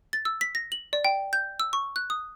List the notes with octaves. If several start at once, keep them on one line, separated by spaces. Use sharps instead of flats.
A6
E6
B6
A#6
F#7
D5
G5
G6
E6
C#6
F#6
D#6